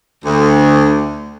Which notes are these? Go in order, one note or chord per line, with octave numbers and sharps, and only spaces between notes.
D2